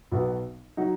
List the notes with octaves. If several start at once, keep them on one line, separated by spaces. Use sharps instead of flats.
B1 B2 B3 F#4
F#3 D#4 F#4